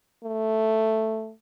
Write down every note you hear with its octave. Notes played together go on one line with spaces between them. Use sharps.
A3